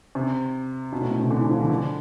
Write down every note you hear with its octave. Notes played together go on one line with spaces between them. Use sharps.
C3
B2
A2
B2
C3
D3
E3
F3
E3
D3